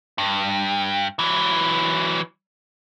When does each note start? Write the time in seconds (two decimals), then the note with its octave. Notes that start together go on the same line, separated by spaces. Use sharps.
0.18 G2
1.19 E3 F#3